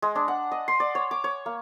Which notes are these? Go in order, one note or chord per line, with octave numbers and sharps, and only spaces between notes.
G#3
D4
F#5
D#5
C6
D5
C#5
D6
C#5
A#3